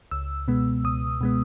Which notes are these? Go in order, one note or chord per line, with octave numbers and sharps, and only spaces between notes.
C#2 E6
B2 G#3 B3
C#2 D#6
B2 G#3 B3